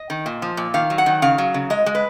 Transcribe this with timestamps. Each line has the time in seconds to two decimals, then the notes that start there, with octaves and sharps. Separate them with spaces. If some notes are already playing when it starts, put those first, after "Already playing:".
Already playing: D#5
0.10 D#3
0.26 A#2
0.42 F3
0.57 A#2
0.74 D#3 F5
0.90 F#3
0.98 F#5
1.06 D#3
1.22 C#3 F5
1.38 F#3
1.54 C#3
1.70 G#3 D#5
1.86 G#3
1.95 B4